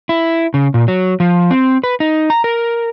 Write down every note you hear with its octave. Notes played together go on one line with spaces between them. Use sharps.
E4
C#3
A#2
F#3
F3
C4
B4
D#4
A#5
A#4